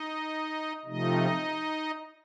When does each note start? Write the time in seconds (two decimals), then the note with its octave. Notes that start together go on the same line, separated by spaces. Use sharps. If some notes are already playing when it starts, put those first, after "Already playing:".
Already playing: D#4 D#5
0.85 C3 F3 A3 D#4 D#5